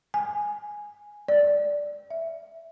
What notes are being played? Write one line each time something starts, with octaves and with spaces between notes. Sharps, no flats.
G#5
D5
E5